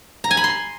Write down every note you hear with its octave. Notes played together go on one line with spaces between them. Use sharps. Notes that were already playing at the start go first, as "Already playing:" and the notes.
A#5
G#5
B5
C6